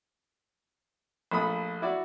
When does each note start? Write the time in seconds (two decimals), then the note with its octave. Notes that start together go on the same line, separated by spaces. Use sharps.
1.31 A#1 A3 B5 D#6
1.82 E4 F#4 D5